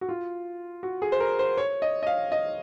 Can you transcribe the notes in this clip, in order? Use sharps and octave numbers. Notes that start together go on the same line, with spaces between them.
F#4
F4
F#4
G#4
C5
A#4
C5
C#5
D#5
D#5
F5
D#5